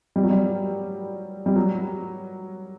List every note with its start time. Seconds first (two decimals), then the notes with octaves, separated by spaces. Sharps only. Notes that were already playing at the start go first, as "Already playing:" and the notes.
0.16 G3
0.23 F#3
0.30 G3
1.46 G3
1.56 F#3